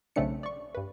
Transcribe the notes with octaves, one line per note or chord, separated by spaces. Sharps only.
B1 C#3 A3 C4 D4 C#7
D5 C#6
G2 B4